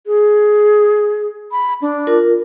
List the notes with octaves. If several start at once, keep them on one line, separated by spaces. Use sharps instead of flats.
G#4
B5
D4
F4 A#4